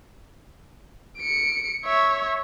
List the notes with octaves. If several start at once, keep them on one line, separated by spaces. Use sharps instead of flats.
C#7 D7
C#5 E5